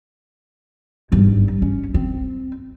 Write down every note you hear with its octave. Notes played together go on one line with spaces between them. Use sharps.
G#1 G2
C#4
C4